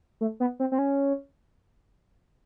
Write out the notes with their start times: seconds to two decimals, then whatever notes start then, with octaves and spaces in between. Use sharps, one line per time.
0.21 A3
0.40 B3
0.60 C4
0.72 C4
0.78 C#4